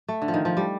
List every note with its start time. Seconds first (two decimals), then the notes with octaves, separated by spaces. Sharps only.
0.08 A3
0.22 D3
0.28 F3
0.34 D#3
0.45 F3
0.57 G3